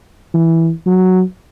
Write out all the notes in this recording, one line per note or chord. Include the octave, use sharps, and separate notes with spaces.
E3
F#3